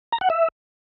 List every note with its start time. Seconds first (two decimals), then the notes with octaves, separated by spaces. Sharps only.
0.12 A#5
0.21 F#5
0.30 E5